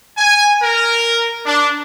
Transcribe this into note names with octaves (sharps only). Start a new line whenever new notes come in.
G#5
A#4
D4